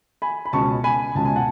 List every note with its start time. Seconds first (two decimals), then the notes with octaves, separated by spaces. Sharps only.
0.22 G#5 B5
0.45 B5
0.53 C#2 B2 G#3 C#4 A5 C#6
0.84 G#5 B5
1.15 C#2 B2 G#3 C#4 A5
1.25 G#5
1.36 F#5 A5